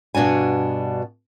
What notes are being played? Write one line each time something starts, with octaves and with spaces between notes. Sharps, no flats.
G2 B2 D4 F#4 G#5